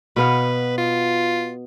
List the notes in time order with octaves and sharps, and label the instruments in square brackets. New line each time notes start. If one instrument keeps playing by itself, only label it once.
[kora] B2 B3 F5 [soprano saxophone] B4
[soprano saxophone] F4